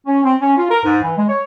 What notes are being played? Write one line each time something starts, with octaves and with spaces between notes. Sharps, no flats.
C#4
C4
C#4
F4
A#4
G#2
E3
G#3
C#5